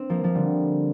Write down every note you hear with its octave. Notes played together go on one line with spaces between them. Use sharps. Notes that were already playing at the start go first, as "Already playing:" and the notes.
Already playing: C4 D4
F3 A#3
F3
D3 G3